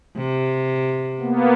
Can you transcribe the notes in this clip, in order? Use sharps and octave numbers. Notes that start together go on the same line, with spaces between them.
C3
A#3 B3